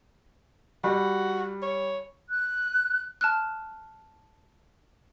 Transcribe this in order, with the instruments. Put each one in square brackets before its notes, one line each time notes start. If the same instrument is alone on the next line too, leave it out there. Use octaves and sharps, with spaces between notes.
[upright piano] G3 [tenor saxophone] F#4
[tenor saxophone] C#5
[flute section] F#6
[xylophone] A5 F6 F#6